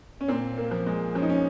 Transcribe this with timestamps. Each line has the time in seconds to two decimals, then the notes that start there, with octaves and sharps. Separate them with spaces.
0.21 C#4
0.28 A#2 C4
0.58 A#3
0.71 F3
0.86 G#3
1.15 F3 C#4
1.22 D#4
1.29 C#4